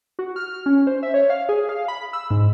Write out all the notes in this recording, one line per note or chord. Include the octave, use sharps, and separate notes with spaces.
F#4
F6
C#4
C5
E5
C#5
F5
G#4
F5
B5
E6
G#2